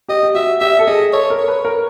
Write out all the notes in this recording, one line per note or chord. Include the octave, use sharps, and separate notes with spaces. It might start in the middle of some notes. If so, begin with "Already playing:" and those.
G4 D#5
G4
F#4 E5
G4 E5
A4
G#4 D#5
A4 C#5
A#4
C#5
B4
A#4